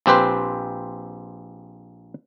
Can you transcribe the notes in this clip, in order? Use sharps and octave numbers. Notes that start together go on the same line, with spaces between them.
A#1 C4 G4 B4 C5